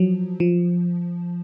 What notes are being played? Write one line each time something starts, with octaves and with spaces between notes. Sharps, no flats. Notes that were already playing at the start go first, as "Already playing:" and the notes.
Already playing: F3 F#3
F3